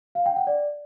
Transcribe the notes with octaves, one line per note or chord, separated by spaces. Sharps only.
F5
G5
F#5
D5